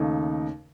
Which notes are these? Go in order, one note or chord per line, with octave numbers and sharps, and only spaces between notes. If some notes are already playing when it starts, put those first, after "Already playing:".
Already playing: D#2 C#3 A3 D#4